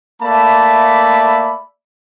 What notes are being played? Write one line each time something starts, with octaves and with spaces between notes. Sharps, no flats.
A3 A#3 D5 E5 A5 B5